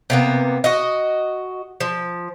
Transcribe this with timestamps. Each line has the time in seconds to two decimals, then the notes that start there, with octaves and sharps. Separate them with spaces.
0.10 C3 A#3 B3
0.64 F#4 D#5
1.80 F3